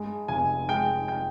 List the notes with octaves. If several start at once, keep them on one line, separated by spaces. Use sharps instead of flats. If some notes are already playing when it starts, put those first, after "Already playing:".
Already playing: G2 G#3
F1 G#5
G#3 G5
G5